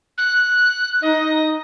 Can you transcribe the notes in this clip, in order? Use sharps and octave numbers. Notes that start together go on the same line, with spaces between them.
F#6
D#4 D#5